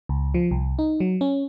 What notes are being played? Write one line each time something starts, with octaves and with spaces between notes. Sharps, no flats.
C#2
F3
C2
D#4
F#3
C#4